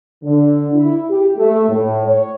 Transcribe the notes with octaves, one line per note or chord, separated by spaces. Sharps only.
D3
E4
G4
A3
A2
C#5